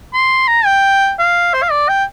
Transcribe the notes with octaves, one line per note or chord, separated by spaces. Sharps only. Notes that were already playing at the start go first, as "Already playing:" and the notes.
C6
A#5
G5
F5
C5
F5
D5
G5